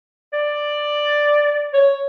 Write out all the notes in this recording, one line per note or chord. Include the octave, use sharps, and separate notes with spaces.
D5
C#5